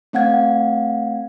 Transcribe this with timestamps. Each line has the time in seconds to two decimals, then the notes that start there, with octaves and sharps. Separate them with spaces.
0.13 A3 C4 F5 F#5 G#6